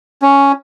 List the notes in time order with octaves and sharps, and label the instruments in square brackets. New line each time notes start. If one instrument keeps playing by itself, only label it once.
[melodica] C#4